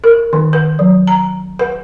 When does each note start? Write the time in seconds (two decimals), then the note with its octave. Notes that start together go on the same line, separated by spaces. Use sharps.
0.04 A#4
0.33 D#3
0.53 B4
0.79 F#3
1.07 A#5
1.59 B4